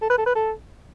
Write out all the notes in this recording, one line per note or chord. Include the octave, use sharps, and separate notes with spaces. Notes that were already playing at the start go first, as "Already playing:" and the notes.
A4
B4
A4
B4
A4